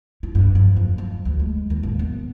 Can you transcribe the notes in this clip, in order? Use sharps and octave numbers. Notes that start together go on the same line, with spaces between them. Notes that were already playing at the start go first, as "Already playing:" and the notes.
E4
G2
F3
F2
F3
D2
G#3
D#2
A1
B3